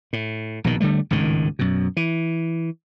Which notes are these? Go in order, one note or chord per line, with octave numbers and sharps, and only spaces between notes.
A2
A#1 B2 D#3
D3 G3 A3
G#1 C#2 A2 D#3
F#2 B2
E3